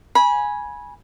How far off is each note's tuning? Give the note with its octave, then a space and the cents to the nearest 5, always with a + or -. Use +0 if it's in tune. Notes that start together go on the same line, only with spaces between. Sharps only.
G#5 +0 B5 -25